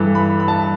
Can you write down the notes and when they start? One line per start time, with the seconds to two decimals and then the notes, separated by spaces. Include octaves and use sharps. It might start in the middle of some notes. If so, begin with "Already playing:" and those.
Already playing: G2 E3 A4
0.15 B5
0.40 B5
0.48 A5